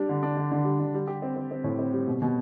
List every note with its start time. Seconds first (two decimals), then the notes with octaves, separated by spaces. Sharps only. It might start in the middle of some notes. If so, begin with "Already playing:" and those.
Already playing: G3 D4
0.09 D3
0.23 D4
0.37 D3
0.52 D3
0.65 G3
0.79 D3
0.94 G3
1.07 G4
1.22 C4
1.36 C4
1.51 C4
1.64 A2
1.79 C4
1.93 G3
2.08 B2
2.22 B2